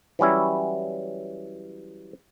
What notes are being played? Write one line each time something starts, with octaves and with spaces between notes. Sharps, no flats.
E3 F#3 G3 C#4 E4